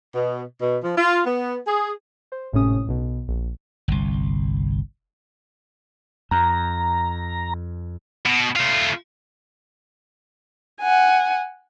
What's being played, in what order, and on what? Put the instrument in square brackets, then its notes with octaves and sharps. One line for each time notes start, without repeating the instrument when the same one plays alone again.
[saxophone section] B2
B2
F3
F4
B3
G#4
[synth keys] C5
G#1 A2 C3 C#4 D#6
B1 B2
A#1
[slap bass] G1 C2
[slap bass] F2 [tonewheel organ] A#5
[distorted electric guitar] B2
A3 F4
[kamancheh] F#5 G#5